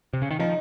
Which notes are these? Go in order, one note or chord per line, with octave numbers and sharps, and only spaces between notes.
C3
C#3
D#3
F3 D#4